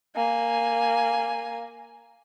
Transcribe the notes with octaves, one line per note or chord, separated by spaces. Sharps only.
A#3 G#5